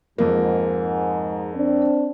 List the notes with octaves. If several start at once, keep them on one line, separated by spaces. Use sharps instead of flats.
F2 G#2 A#3
C4 D4